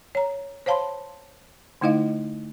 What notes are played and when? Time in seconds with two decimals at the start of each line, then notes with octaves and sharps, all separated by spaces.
0.15 C#5 A#5
0.66 C5 C#5 F5 A5 B5 C6
1.81 D3 A3 D#4 E4 D#5 F5